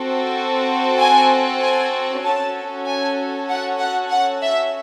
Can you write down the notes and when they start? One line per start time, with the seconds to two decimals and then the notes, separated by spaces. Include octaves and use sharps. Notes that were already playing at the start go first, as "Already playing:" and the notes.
Already playing: C4 F#4 A4
0.99 G#5
1.61 G#5
2.23 C#4 F#4 A4 A5
2.86 G#5
3.49 F#5
3.80 F#5
4.11 F#5
4.43 E5